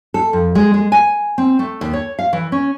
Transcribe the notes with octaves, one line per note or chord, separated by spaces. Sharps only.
A4
F2
G#3
G#3
G#5
C4
A3
D#2
C#5
F5
E3
C#4